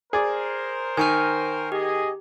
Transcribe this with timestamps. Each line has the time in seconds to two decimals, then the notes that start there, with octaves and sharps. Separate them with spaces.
0.13 G#4 A#4 C5 D5
0.97 D#3 G#5 C#6 F6
1.72 G4 G#4 D#5